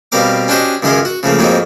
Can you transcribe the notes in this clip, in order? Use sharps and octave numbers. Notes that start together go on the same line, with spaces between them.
B2 G3 C4 A#4 F5 D6
C#4 D4 F#4 G4 C5 D#5
C#2 F#2 D#3 G#4 A#4 C6
F#4
C#3 F3 A3 A#3
F2 G#2 F#3 A#3 C4 D#4